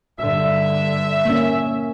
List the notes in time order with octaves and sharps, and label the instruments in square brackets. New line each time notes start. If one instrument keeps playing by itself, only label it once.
[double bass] G2 D3 [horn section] E5
[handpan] A#3 C#4